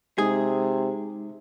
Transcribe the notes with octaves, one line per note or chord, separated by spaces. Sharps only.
C3 G#3 D#4 G#4